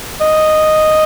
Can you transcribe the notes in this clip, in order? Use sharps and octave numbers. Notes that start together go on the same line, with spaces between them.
D#5